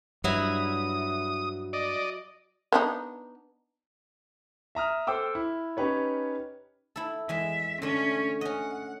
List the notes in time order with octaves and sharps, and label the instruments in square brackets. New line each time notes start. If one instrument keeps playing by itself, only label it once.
[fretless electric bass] G2 [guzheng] F#3 E4 [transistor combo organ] D#6
[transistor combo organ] D5 D#5
[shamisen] B3 D4 D#4
[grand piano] E5 A#5 D#6 F6
A4 C5 G5 D6 E6
E4
C#4 D#4 G4 B4 C#5
[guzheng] E4 A4
[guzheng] E2 G#3 [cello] E5
[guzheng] D3 A3 [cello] C#4
[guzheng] C#4 D#5 [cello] F#5